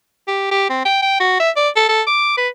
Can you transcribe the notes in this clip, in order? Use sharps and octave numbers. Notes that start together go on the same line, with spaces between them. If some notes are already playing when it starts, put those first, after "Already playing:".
G4
G4
C4
G5
G5
F#4
E5
D5
A4
A4
D6
B4